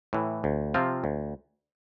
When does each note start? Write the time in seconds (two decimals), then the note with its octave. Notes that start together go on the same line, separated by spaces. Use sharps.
0.13 A2 E3
0.44 D2
0.74 C3 F3 C4 F4
1.04 D2